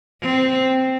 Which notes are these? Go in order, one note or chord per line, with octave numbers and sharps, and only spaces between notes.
C4